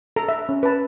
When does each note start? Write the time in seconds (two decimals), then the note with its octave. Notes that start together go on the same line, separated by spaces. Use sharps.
0.16 A4 A#5
0.28 E5
0.49 C#4
0.63 B4 A5